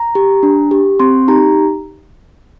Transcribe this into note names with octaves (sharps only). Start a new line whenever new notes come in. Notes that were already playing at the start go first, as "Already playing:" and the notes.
Already playing: A#5
G4
D4
G4
C4 C6
D#4 G4 A#5